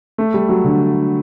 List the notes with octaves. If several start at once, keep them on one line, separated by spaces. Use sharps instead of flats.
A3
G3
F#3
D3